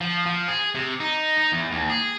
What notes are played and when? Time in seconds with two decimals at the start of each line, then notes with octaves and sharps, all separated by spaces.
0.01 F3
0.26 F3
0.48 G#4
0.75 C3
1.00 D#4
1.38 D#4
1.52 E2
1.71 D#2
1.90 G#4